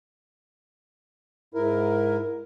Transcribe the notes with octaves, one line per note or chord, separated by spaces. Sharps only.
G#2 E4 A#4